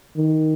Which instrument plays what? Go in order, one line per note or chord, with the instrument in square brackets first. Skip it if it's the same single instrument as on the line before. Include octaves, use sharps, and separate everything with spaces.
[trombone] D#3